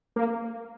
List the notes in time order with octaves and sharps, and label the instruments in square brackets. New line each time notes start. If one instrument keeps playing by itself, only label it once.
[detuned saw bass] A#3